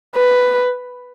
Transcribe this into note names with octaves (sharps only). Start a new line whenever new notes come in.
B4